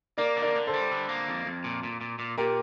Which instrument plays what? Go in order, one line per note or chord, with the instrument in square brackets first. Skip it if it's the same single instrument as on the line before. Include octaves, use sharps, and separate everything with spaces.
[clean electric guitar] A#3 [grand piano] A#4 D5
[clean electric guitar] D3
[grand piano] A#4 D5
[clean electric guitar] D3
[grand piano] A4 C5
[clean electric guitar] G3
D3
A#3
F2
F2
A#2
A#2
A#2
A#2
[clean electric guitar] A#2 [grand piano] G4 A#4